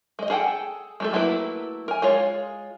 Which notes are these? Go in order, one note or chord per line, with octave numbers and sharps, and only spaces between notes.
G#3 D#5
G#4 A4 F#5 G5
G#3 A3 A4
F#3 A3 A#3 E4 B4
A#4 G#5
G#3 F4 C#5